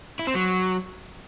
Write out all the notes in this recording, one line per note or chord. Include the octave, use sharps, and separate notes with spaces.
E4
C4
F#3